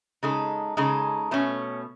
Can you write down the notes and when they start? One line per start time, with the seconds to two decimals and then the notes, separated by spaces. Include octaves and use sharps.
0.23 C#3 G#3 D#4 A4
0.77 C#3 G#3 D#4 A4
1.31 B2 A3 C#4